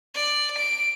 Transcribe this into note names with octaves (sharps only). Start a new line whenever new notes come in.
D5
D7